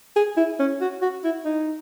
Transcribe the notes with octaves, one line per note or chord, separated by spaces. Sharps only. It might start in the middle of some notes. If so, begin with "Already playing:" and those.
G#4
E4
C#4
F#4
F#4
E4
D#4